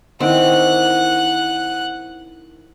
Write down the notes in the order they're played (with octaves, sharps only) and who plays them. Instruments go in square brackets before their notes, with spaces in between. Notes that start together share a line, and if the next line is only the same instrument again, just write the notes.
[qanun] D#3 E3 C4 [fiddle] F#5 F#6